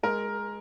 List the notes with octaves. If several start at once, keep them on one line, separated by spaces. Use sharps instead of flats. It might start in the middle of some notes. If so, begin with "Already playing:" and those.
G#3 A#4